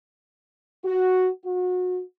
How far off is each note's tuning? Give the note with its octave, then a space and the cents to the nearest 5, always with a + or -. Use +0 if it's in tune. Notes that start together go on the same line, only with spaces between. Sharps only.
F#4 +0
F#4 -30